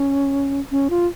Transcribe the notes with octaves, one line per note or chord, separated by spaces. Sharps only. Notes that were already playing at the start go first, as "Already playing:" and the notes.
Already playing: C#4
C#4
F4